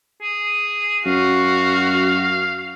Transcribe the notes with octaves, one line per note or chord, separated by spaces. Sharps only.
G#4
F#2 F#4 F5